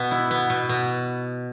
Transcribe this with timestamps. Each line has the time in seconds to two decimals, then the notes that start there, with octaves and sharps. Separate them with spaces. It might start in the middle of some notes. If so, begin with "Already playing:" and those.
Already playing: B2 B3
0.11 E4
0.31 B3
0.50 B2
0.69 B2